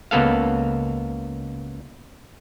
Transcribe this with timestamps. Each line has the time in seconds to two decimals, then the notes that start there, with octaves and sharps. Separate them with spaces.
0.11 C#2 A#3 B3 A4 F5